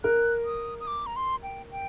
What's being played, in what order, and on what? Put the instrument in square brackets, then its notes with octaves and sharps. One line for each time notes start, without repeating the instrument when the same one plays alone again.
[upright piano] A#4 [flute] F#6
[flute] D#6
D#6
D6
A#5
C6
G5
G5